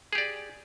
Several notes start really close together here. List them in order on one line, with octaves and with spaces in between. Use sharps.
G#4 G4 D5